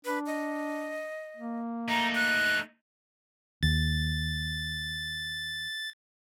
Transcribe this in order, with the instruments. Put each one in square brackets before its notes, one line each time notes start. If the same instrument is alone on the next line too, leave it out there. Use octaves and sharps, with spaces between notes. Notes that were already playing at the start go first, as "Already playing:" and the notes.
[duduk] D4 [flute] B4
[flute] D#5
[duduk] A#3
[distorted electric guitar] A3 D#4 [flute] A#5
[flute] F#6
[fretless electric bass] D#2 [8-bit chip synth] A6